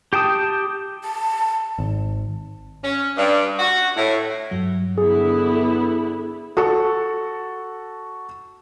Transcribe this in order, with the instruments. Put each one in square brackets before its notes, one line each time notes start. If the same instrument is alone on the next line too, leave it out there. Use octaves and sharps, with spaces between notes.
[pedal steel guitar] G4 G5 A5 D#6
[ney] A5
[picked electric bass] G#1
[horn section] C#4
G2
F#4
A2
[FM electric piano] G2 F#3
[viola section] D3 B3 E4 [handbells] G#4
[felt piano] F#4 A4 C#6